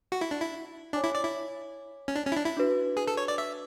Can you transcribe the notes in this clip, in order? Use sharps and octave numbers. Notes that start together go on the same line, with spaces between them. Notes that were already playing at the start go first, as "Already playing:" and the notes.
F#4
E4
D4
E4
D4 C#5 G#5 D6
E4
D5
E4
C#4
D4
C#4
E4
D4
E4
D4 F#4 B4
G#4
A4
C#5
D5
E5